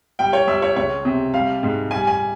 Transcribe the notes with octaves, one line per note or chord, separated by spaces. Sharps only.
G3 G5
C#5
G3 E5
C#5
C#2 C#5
C3
G3 F5
G#2
G3 G#5
G#5